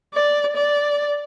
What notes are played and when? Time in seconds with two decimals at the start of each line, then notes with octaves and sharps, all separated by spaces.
0.14 D5
0.57 D5